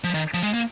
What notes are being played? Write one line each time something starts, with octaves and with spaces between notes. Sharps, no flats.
F3
D#3
F3
G#3
A#3